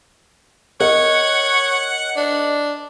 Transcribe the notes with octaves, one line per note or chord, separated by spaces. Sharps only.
A#4 C#5 D#5 F#5
D4